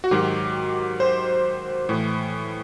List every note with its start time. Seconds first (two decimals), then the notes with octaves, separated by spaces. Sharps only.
0.04 F#4
0.11 G#2 D#3 F#3 G4
1.00 C5
1.89 A2 E3